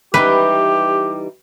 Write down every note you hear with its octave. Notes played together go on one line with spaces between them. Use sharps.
E3 G3 D#4 G4 B4